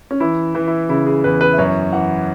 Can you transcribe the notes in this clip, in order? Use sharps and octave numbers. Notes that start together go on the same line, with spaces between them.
C#4
E3 E4
E3
E4
C#3 E4
G#4
E2 B4
B4
E5
F#2 C#5
E3 F#5